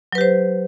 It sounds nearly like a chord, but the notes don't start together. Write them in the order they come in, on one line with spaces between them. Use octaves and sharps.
F#3 B4 G4 C5